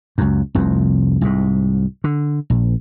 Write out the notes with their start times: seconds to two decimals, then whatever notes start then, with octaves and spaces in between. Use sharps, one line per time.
0.18 C#2 F#2
0.55 F1 C2 F2
1.21 C2 G#2
2.04 D3
2.50 A#1